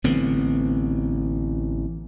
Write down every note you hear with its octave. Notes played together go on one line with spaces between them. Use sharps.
A1 D3 B3 C4